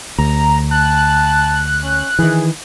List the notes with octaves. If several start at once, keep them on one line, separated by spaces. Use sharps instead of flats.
D2 A#5
A5 F#6
C#4
D#3 E3 G#4